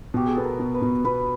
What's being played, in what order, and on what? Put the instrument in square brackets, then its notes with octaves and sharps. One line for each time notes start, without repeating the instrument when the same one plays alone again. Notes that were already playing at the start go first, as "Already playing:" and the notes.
[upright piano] B2 [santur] G4
[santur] G#4
[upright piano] B3 [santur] A4
[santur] A#4
[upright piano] B2
[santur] B4
[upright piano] B2
[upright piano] B2 [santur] B4